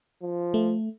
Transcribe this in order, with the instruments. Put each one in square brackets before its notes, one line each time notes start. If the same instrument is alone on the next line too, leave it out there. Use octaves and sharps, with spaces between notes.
[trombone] F3
[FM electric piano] A3